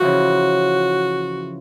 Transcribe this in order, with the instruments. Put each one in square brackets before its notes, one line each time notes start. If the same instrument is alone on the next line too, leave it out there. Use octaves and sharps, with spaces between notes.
[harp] C#3 E3 F3 [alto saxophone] F#4